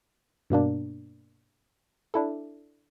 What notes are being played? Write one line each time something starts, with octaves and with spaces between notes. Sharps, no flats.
G2 B2 A#3 D4
D4 E4 A4